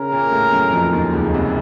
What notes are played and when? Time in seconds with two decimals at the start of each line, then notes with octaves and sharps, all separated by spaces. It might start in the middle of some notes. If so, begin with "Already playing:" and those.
Already playing: C#3 C#4 A#4
0.12 A#2 A#3
0.32 A2 A3
0.52 F#2 F#3
0.72 F2 F3
0.93 D#2 D#3
1.13 C#2 C#3
1.34 C2 C3